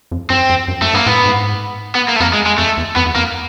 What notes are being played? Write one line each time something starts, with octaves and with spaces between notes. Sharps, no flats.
F2
F#2 C4
F2
F#2
F#2 A3
G2 A#3
A2 B3
G#2
B3
A#3
A3
F2 A#3
G#3
G#3
F2 A3
E2
F2 B3
E2
F2 A#3